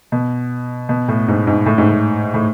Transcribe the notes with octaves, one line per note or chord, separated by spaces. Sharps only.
B2
B2
A2
G#2
G#2
A2
G#2
A2
A2